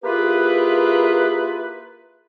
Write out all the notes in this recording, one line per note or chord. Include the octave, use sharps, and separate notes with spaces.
A#3 E4 F4 G4 G#4 B4